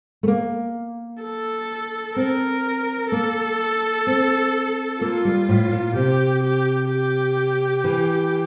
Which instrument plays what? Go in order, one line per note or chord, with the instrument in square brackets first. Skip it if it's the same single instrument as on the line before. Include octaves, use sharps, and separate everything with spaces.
[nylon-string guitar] A3
A#3
[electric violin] A4
[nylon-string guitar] C4 [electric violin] A#4
[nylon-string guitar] A#3 [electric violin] A4
[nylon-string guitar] C4
[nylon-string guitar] A#3 [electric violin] F4
[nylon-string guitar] G3
A2
A#2
[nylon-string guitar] C3 [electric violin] G4
[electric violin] G4
G4
[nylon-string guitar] E3